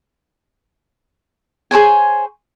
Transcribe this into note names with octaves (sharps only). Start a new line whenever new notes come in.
G#4 C5 C#5 G#5